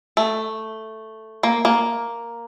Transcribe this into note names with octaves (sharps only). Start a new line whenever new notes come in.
A3
A#3
A#3